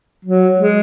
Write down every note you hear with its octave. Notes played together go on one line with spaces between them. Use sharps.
F#3
G#3